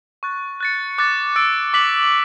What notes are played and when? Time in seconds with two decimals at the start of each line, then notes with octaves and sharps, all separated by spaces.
0.23 C#6 F#6 A6
0.61 F#6 A6 C#7
0.98 D6 F#6 A6
1.36 E6 A6 D7
1.73 D6 F#6 B6 F#7